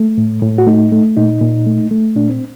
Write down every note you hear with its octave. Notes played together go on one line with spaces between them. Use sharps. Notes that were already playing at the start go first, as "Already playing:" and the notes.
Already playing: A3
A2
A2
F#4
A3 D#4
A3
A#2 D#4
A#2
A3
A3
A#2 D4
C4